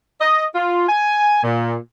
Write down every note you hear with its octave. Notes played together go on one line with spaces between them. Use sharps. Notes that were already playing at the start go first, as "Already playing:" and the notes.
D#5
F4
G#5
A#2